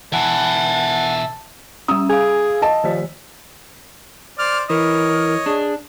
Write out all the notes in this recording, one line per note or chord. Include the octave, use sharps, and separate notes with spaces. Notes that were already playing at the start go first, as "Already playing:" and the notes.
B2 E3 E5 F#5 G#5 A5
G3 C#4 D#6 E6
G#4 F5 G#5
D#5 A5
D#3 F3 G4 D5
C5 D5 F6
E3 A#4 C#5 D#5
D4 G#4